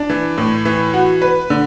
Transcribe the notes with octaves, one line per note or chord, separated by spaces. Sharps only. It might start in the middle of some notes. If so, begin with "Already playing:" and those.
Already playing: D4
E3
A2
E3
F#4
B4
D3